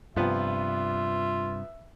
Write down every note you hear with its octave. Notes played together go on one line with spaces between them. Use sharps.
G2 C3 F3 B3 F4 E5